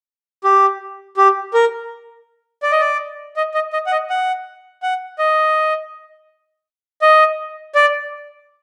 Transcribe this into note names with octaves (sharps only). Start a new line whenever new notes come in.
G4
G4
A#4
D5
D#5
D5
D#5
D#5
D#5
F#5
D#5
F#5
F#5
D#5
D#5
D5